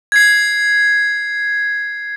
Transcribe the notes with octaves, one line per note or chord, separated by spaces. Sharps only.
G#6 C7